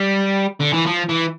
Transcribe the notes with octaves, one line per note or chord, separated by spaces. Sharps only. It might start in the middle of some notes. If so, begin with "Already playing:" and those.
Already playing: G3
D3
E3
F3
E3